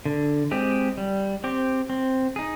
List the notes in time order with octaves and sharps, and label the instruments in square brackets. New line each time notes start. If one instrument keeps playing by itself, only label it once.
[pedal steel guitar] D3
G#3 C4 G4
G3
C4 G4
C4
D#4 G#4